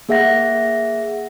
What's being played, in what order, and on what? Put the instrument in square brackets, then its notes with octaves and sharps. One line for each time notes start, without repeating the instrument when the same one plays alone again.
[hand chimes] A#3 G#4 E5 F#5 A#6